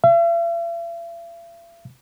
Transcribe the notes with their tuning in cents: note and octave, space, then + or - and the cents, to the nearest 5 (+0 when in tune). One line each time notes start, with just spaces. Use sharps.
E5 +45